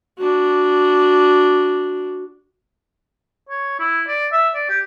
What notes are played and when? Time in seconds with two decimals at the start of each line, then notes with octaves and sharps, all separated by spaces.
0.19 D4 F#4
3.49 C#5
3.80 E4
4.07 D5
4.33 E5
4.55 D5
4.69 G4